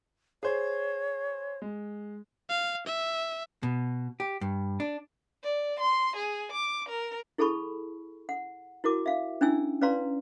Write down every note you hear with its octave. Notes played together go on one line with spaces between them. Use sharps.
G#4 C5 C#5
G#3
F5
E5
B2
G4
G2
D4
D5
C6
G#4
D6
A#4
E4 G#4 A4 A5 B5 C#6
F#5
E4 F#4 A#4 D6
E5 F5
C#4 D4 E4 G5 G#5 E6
C#4 B4 D5 F5 A#5 C6